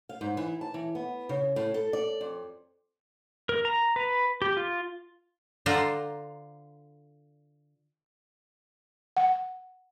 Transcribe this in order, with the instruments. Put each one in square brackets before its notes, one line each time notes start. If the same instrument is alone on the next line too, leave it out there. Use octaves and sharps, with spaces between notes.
[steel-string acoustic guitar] F5
G#2
E3
A5
E3
B3
C#3
A2
A4
D5
F2
[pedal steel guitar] A#4
A#5
B4
G4
F4
[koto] D3 F4 C5 D5 G#5 A#5
[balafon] F#5